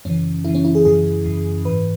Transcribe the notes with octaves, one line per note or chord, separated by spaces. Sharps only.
F#2 C#3 E3 C#4
F#2 C#3 E3 E4
C#4
E4
G#4
F#2 C#3 E3 G#4
F#2 C#3 E3
G#2 E3 B4